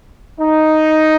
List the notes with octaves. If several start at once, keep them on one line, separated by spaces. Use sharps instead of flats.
D#4